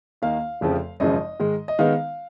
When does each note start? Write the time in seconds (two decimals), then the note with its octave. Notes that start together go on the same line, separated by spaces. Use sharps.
0.22 D#2 D#3 A#3 D#4 F5
0.61 F1 F2 C#3 F3
1.00 G#1 F#2 C#3 F3 D#5
1.40 G#2 D#3 G#3
1.68 D#5
1.79 D#3 G#3 B3 D#4 F5